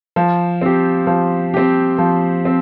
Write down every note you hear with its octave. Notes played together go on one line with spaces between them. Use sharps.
F3
C4 G4
F3
C4 G4
F3
C4